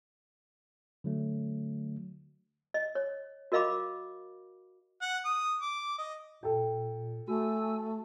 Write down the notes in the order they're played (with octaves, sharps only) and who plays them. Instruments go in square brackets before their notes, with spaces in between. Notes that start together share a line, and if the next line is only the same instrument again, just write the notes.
[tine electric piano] D3 F#3 A3
[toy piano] D#5
C#5
F#4 A#4 D#5 F5 B5 D6
[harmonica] F#5
D#6
D6
D#5
[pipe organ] A#2 [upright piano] A4 G5
[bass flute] A3 [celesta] F#4 [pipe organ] G#5 E6